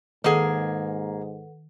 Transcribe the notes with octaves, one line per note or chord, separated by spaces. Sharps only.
G#2 D#3 A#3 G#4 A4 B4 F#5